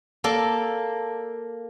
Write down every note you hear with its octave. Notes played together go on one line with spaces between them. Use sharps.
A#3 A4 D5